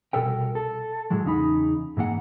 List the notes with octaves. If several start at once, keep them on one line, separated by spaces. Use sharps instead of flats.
C2 G#2 B2 A4 A#4 G5
A4
A2 E3 F#3 G#3
E2 C#3 D#4 B5
G#2 E3 A#3 F#5